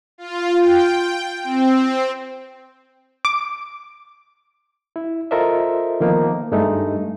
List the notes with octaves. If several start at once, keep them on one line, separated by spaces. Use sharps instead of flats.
F4
G5
C4
D6
E4
F4 A4 A#4 C5 D#5 E5
D#3 F3 A#3 B3 D#4
G2 G#3 A3 D#4